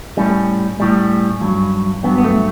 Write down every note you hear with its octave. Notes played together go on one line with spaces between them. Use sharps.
A2 G3 C#4
A2 G3
G2 F#3
G2 F#3 B3
B3
A3